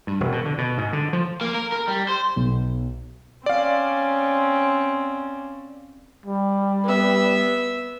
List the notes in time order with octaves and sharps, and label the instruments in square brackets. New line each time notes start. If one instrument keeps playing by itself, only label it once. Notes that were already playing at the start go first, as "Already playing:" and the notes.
[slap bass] G2
E1
B2
D3
B2
G#2
D3
F3
[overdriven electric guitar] A#3
A#4
A#4
G3
C5
[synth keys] B1
[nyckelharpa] C4 C#4 [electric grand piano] D5 F5
[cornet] G3
[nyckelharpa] B3 E5